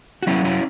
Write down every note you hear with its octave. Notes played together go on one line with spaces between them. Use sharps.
F#4
F#3 C#4 E4
C#4 E4